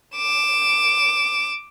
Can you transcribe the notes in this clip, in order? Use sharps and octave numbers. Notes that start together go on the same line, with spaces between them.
D6 E7